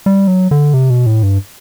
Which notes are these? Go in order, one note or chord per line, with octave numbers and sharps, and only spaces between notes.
G3
F#3
D3
C3
B2
A2
G2